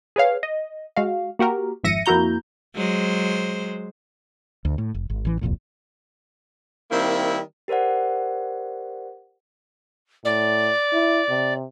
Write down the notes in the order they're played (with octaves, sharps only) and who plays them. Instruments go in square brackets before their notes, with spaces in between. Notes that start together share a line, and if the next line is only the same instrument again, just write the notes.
[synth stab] G#4 B4 C#5 F5
D#5
G#3 F#4 F5
A#3 F#4 G4 A#4
G#1 F2 E5 A#6 C#7 D#7
F2 A#3 E4 F#4 A#5 G6
[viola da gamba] F#3 G#3 C5
[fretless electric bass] D2
A2
F1
G#1
A1 E3
D#1 C2 F2 A#2
[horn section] D#3 G3 A#3 C4 E4
[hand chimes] G4 A#4 C5 D5 F#5
[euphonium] A2 [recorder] D5
[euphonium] E4
C3